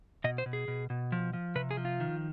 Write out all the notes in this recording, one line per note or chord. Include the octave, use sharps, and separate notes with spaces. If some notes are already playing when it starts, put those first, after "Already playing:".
B2 D#5
C5
B2
G#4
B2
B2
F3
F3
C3 B4
G#4
F3
F4
D#3